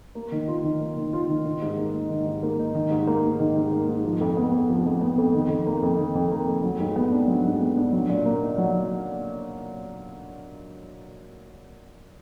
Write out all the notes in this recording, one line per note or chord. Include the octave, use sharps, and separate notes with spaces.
A#3
D#3
F4
D#3
A#3
D#3
F4
D#3
D#3
G#2
A#3
D#4
D#3
G#2
A#3
D#4
D#3
G#2
A#3
G#2
D#3
G#2
A#3
G#2
F3
F2
B3
F2
F3
F2
B3
F2
D#3
F2
A#3
F2
D#3
F2
A#3
F2
F#3
G#2
B3
D4
F#3
G#2
B3
D4
F#3
A#2
A#3
D#4
F#3